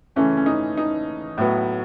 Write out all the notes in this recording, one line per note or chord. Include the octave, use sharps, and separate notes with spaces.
C#3 E3 A3 C#4
C#4
D#4
D#4
A2 F#3 B3